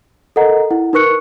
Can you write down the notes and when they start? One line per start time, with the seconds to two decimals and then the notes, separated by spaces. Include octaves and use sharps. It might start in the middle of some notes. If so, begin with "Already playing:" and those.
0.36 A4 A#4 D#5 F#5 A#5
0.71 E4 F#5
0.93 D#4 A#4 B4 C#6 F#6 C#7